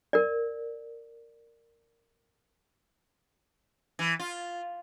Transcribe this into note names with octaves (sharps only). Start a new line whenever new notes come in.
A#4 D5
E3
F4